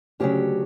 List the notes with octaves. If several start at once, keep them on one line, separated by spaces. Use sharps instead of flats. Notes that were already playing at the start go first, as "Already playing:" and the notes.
D2 C#3 F#3 G4